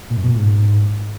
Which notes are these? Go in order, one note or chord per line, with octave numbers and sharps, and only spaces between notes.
A#2
F#2
B2
A#2
G#2